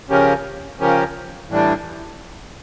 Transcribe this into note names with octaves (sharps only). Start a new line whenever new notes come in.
C#3 F3 C#4 G4 A#4
C#3 F3 C#4 G4 A#4
A2 E3 G3 D4